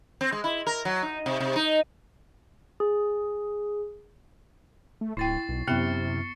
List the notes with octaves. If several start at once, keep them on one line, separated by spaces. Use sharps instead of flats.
C4
G#3
E4
A#4
F#3
D#4
C3
C3
D#4
G#4
A3
D1 E4 G5 C#6 A6 C7
B1
F#2 C3 B3 E4 C#6 F6 C#7 G7